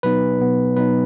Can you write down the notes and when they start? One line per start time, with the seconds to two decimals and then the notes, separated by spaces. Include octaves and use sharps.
0.03 B2 F#3 B3 D#4 B4
0.40 B2 F#3 B3 D#4
0.76 B2 F#3 B3 D#4 B4